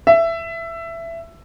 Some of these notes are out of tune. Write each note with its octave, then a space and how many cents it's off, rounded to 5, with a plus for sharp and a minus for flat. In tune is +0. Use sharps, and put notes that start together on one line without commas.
E5 +15